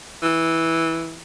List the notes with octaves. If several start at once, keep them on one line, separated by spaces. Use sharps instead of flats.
E3